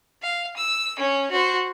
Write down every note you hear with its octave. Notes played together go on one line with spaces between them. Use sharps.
F5
E6
C#4 C#5
F#4 C5